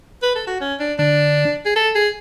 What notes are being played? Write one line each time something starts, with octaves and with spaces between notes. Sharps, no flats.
B4
A4
F#4
C#4
D4
D3 D4
G#4
A4
G#4